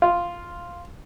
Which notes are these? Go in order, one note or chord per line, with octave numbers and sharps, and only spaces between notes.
F4